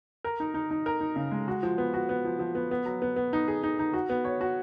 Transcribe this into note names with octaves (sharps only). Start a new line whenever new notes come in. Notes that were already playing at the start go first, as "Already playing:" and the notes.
A#4
D#4
D#4
D#4
A#4
D#4
C#3
G#3
F#4
F3
B3
F#4
B3
F3
F3
B3
B3
F#3
B3
B3
D#4
G#4
D#4
D#4
F#4
B3
C#5
F#4